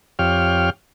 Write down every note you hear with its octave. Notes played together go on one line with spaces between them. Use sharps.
F2 G4 C#5 F5 G5 F6